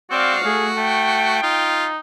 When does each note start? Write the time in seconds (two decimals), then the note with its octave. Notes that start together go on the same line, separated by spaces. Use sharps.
0.11 C4 F#4 D5 F5
0.45 A3 G#4
0.78 A3 G5
1.43 D#4 F4